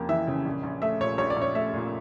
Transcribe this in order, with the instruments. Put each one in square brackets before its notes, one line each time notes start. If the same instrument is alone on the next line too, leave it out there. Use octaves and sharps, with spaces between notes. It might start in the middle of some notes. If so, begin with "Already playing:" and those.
Already playing: [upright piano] F2 C#3 A#3 G4
E3 E5
C#3
A#1
A#1
A3 E5
A#2 C#5
A#1 C#5
D5
A#1
C#5
A3 E5
A#2